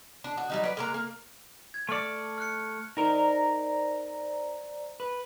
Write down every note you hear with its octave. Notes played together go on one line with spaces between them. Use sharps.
D4
F#4
F#3 G3 D#4
B4 D5
G#3 A#3 A#5
A#3
G#6
A3 D5 A5 F6 C#7
F6 F#6 C#7
D#4 A#4 C5 D5 A#5
B4